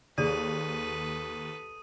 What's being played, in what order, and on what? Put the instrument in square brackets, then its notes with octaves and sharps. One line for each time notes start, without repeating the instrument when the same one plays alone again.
[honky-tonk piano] D#2 [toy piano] G#4 D5 [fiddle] A4 B4 [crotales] D#6 D#7